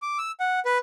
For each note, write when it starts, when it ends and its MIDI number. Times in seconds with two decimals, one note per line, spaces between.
0.02 0.18 86
0.18 0.31 88
0.40 0.60 78
0.65 0.78 71